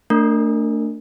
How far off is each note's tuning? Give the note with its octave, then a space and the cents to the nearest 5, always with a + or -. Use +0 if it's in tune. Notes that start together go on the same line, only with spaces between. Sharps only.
A3 +30 D4 +0 A#4 -20